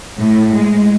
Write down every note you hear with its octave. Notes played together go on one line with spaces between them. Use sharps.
A2
G#3